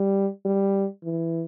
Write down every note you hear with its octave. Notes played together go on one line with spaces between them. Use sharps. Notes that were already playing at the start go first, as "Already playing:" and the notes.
Already playing: G3
G3
E3